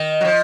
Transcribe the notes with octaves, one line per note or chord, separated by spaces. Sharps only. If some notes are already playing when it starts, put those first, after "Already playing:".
Already playing: D#3
F#3
F3